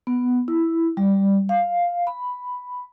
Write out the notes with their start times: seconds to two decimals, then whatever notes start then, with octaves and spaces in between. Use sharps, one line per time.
0.07 B3
0.48 E4
0.97 G3
1.49 F5
2.07 B5